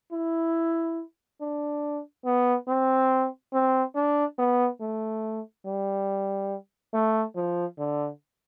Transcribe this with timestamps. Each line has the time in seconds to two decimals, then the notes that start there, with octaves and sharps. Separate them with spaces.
0.12 E4
1.41 D4
2.25 B3
2.68 C4
3.53 C4
3.95 D4
4.39 B3
4.81 A3
5.66 G3
6.94 A3
7.36 F3
7.78 D3